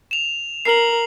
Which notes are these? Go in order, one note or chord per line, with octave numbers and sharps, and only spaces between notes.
E7 F7
A#4 C7 F#7